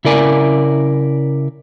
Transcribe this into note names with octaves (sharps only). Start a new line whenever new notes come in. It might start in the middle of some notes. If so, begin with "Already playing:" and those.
C#3 E4 A#4 D5 G#5